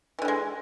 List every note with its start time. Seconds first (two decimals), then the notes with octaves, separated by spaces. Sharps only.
0.19 E3
0.22 D3
0.25 G3
0.28 G#3